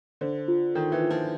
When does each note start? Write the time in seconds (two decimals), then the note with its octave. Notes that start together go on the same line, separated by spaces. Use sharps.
0.21 D3 C5
0.48 F4
0.75 D#3 A4
0.92 E3
1.01 F4
1.10 F3